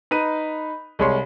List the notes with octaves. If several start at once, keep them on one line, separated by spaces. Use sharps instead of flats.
D#4 B4 D#7
C2 G#3 C#5 C6